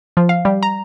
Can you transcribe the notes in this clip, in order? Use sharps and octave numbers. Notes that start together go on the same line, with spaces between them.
F3
F5
G3
A#5